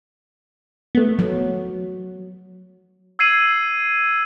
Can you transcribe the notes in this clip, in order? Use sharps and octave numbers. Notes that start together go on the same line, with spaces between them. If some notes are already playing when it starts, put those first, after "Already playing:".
A3 B3
F#3
E6 G#6 C7 D#7 F#7